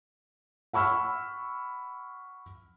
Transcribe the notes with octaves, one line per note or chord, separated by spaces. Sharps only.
F#5 B5 C#6 E6 F6